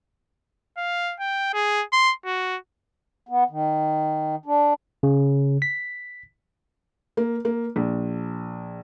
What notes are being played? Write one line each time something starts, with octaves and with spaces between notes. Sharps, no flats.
F5
G5
G#4
C6
F#4
B3
D#3
D4
C#3
B6
A#3
A#3
A#1